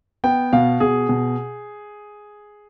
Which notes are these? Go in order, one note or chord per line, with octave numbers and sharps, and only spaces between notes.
B3 G5
B2 F5
B2 G#4
B2